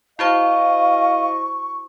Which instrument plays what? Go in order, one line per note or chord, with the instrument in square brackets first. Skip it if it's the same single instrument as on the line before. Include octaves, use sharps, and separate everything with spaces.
[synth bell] E4 F#4 C5 [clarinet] D#5 [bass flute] F5 [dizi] C#6